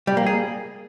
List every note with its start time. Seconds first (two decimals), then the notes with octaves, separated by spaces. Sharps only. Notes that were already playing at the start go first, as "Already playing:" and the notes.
0.07 G3
0.17 A#3
0.26 G#4